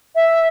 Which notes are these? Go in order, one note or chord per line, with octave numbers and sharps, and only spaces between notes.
E5